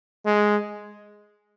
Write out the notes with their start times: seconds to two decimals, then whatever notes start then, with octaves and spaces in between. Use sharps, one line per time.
0.26 G#3